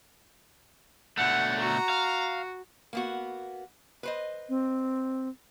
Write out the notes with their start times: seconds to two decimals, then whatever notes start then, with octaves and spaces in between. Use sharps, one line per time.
1.17 B2 D3 A3 F#5
1.59 F#4 A#5
1.89 F5
2.93 A#3 B3 F#4
4.03 B4 C5 D#5
4.49 C4